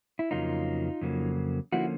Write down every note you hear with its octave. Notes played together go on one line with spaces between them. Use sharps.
E4
F2 C#3 F#3 A#3 D#4 F4
F2 C#3 F#3 A#3
D3 F3 A#3 C#4 E4 F#4